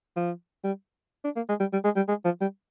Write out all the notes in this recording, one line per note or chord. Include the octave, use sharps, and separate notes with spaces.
F3
G3
D4
A#3
G#3
G3
G3
G#3
G3
G#3
F3
G3